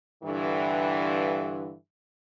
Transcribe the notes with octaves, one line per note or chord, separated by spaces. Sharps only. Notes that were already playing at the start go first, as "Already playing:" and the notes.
G2 D3 E3